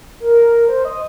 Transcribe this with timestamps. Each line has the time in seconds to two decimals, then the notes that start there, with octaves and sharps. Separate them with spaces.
0.20 A#4
0.68 C5
0.85 D#5